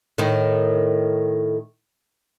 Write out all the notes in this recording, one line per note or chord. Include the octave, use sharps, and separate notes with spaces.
A2 D#3